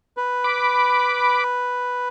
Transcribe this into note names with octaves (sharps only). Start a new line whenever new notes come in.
B4
B5 D6